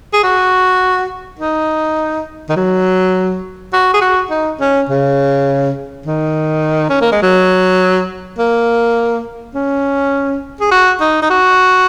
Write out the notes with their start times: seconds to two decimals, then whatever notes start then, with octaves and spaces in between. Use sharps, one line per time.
0.13 G#4
0.23 F#4
1.39 D#4
2.49 D#3
2.56 F#3
3.73 F#4
3.94 G#4
4.01 F#4
4.30 D#4
4.61 C#4
4.89 C#3
6.06 D#3
6.90 C#4
7.01 A#3
7.12 G#3
7.22 F#3
8.39 A#3
9.55 C#4
10.61 G#4
10.71 F#4
11.00 D#4
11.22 D#4
11.30 F#4